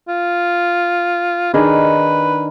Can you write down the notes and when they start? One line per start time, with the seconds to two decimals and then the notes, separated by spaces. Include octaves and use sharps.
0.08 F4
1.54 D#3 D4 G#4 B4